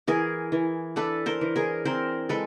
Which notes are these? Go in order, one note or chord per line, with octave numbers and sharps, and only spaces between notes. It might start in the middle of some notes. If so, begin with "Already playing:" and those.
E3 G#4 A#4
E3
D4 A4 B4
A#4 C5
E3
G#4 A#4
C4 A#4 C5
G#3 A4 B4